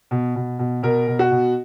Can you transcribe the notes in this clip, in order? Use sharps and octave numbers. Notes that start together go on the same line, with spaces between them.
B2
B2
B2
B2 A#4
B2
F#4
B2